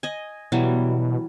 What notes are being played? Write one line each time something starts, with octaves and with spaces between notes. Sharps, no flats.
D#5 G#5
B2 E3 F#3 G3